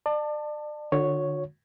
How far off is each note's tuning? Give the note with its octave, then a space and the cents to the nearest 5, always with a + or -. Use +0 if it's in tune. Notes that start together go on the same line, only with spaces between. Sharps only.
D5 +35 A5 +15
D3 +25 F#4 -40 C#5 +0